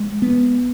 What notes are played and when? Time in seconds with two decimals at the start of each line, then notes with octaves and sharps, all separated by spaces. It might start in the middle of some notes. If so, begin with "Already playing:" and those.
Already playing: G#3
0.22 B3